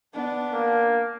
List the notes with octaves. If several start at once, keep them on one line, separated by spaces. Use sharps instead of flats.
B3 D4
A#3